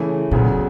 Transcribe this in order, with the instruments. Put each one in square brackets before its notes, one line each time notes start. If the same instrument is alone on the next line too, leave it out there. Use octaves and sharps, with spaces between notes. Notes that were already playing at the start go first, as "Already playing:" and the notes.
Already playing: [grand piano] C#3 E3 A3
[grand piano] D2 C#3 F#3 B3 [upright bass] A#2